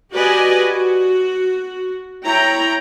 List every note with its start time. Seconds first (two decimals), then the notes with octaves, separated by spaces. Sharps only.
0.13 F#4 G4 B4 D5 D#5 G#5
0.61 F#4
2.24 E4 C#5 G5 A#5